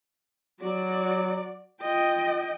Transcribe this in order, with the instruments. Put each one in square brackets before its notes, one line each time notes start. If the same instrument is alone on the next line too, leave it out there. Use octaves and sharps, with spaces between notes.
[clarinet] F#3 [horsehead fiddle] F#4 D5
[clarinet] F4 [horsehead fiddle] D#5 G5